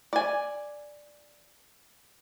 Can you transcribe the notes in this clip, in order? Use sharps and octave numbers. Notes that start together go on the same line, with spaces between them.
D5 G#5